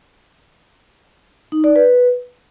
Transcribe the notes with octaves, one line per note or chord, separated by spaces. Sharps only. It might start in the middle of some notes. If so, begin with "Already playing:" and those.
D#4
D5
B4